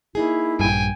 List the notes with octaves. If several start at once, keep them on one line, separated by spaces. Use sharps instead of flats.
A#3 D#4 E4 G#4
A#1 G2 G5 G#5